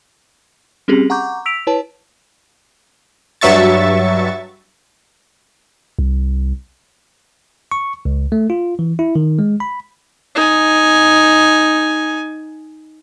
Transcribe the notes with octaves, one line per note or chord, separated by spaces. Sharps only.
G3 C4 C#4 G4 G#4
F#5 A#5 C#6 D6 G6
E6 B6 D7 F7
E4 B4 C#5 A5
G2 F#3 E5 C#6 A6
C2
C#6
C#2
A3
F4
E3
E4
D#3
G#3
B5
D#4 G#5